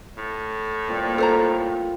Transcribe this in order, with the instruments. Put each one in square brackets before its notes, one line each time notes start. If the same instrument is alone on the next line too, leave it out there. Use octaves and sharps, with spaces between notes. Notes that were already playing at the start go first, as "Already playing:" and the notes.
[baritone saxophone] A2
[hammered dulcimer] A#2 G3 C4
[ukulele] A4 C5 A#5